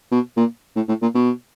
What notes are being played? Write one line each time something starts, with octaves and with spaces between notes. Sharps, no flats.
B2
A#2
A2
A2
A#2
B2